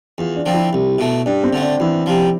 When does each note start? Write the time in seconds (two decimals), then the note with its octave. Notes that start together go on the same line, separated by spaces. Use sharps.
0.18 E2 F4
0.36 D4
0.46 D3 F3 C4
0.54 E4
0.73 C2
0.98 B2 A3
1.26 G2 D4
1.44 C4
1.53 D3 A3
1.62 D4
1.80 E2 E4
2.06 C3 F3